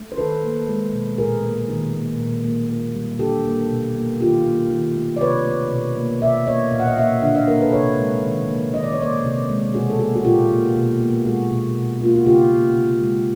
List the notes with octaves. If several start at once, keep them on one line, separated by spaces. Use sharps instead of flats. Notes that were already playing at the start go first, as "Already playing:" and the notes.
Already playing: A3
C5
D#3 A4 B4
A#3
G#3
B2
A#2 G#4 A#4
A#3
D#3
A#3
A#2
A#3
A#3
G3
D3 G4 A4
A#3
B2
A#3
D#3 F4 G4
A#3
D#3
A3
D5
C3 B4 C#5
A3
B2
A#3
B2 D5 E5
A#3 C#5 D#5
A#2 F5
F#5
D#5 F5
A#3 E5 F#5
D3 E5 F#5
D#5 F5
A#3 A#4 C5
A4 B4
C3 B4 C#5
G#3
D#3
A#3
D#3 D#5
D5
C#5
A#3 C5 D5
C3
G#3
B2 F#4 G#4
A4
A#3 F#4 G#4
F#4
A#2 F4 G4
A#3
B2
A#3
G#3 F#4 G#4
B2
B2
A#3 F4
F#4
C#3 F4 G4
A#3
C3
G#3